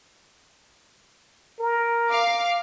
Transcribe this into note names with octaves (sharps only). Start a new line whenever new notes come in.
A#4
F5 D6